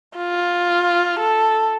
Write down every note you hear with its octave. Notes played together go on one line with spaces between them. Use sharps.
F4
A4